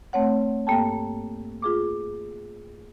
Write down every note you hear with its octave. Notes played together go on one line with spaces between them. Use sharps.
A3 C4 C#5 F#5
G2 A#3 A4 G5 A5
F4 G#4 D6